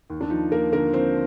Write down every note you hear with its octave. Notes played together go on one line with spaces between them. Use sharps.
D#2
D4
F3 D#4
F3 A#3 A#4
D3 A#3 A#4
F3 C4 C5